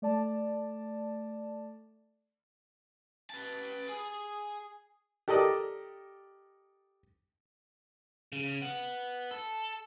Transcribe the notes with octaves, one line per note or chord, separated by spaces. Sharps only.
A3 D5 A5
B4 A5
G#4
G4 A4 A#4 D5 D#5
C#3
B3
A4